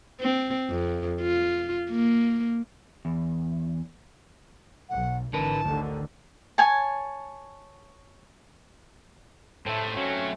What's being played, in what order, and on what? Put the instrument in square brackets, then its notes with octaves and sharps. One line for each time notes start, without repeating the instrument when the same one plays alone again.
[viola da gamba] C4
F2
F4
A#3
[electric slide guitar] E2
[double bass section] B1 [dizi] F#5
[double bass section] G#1 E3 [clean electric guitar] D3 A#4 B4 [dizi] A5
[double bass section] A1 D3 D#3 [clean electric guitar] D2
[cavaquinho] C#5 G#5 A5
[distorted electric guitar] A2 [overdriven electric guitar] A3 C4 [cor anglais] A4
[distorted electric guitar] F#3 [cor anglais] C#4